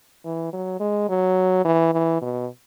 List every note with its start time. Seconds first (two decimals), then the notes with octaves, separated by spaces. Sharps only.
0.25 E3
0.53 F#3
0.80 G#3
1.09 F#3
1.65 E3
1.93 E3
2.22 B2